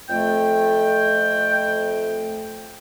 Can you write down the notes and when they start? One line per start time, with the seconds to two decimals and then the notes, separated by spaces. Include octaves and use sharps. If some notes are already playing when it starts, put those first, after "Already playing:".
0.10 F2 A3 G5